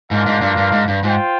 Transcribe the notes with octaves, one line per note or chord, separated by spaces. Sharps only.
G#2 D4 F4 A#4 F5
G#2
G2
G2
G#2
G2
G#2 F4 C5 G5